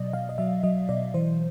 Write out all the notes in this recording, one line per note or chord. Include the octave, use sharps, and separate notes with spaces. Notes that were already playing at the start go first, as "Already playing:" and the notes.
Already playing: B2 F#3 D5 D#5
B2 F5
D#5
F#3 E5
F#3 D#5
B2 D5
E3 C5